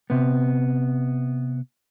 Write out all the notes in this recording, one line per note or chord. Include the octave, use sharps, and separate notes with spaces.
C3 B3